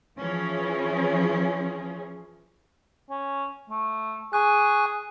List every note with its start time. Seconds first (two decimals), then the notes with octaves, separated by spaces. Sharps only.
0.18 E3 F3 C#4 G#4
3.10 C#4
3.70 A3
4.33 G#4 G#5 C#6 F#6